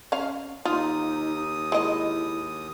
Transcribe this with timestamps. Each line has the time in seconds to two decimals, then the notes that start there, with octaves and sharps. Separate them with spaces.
0.12 C#4 F5
0.65 D#2 D#4 F4 D#6
1.72 G#3 E4 D#5